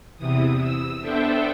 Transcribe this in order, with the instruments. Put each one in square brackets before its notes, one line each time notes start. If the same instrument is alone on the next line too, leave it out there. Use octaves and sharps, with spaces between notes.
[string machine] E2 C3 E3 D#6
E6
B3 D4 A4 C5 E5 G5